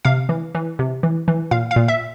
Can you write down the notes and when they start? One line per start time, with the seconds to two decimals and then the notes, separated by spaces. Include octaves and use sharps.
0.05 C3 F5
0.29 E3
0.55 E3
0.79 C3
1.03 E3
1.28 E3
1.51 A#2 F5
1.71 F5
1.76 A#2
1.88 E5